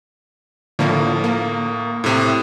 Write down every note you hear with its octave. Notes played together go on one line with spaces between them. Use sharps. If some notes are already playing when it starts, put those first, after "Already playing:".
A2 D3 F3 A#3
A#3
A2 C3